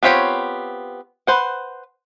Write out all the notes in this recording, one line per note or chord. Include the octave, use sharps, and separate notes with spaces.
B3 C4 F4 G4 C#5
B4 C5 F#5